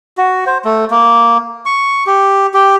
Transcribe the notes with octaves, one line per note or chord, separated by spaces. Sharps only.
F#4
C5
A3
A#3
C#6
G4
G4